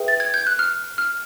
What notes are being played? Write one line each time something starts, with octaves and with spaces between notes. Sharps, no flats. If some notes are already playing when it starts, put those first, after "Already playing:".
Already playing: G#4 B4 E5 G5
A6
G#6
G6
F#6
F6
F6